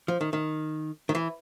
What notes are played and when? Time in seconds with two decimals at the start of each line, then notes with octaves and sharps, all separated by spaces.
0.08 F3
0.21 D#3
0.33 D#3
1.09 D#3
1.15 E3